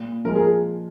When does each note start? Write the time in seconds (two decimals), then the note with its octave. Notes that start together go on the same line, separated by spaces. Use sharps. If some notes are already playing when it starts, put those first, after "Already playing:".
Already playing: A#2
0.25 F3 G#3 A#4
0.35 G#4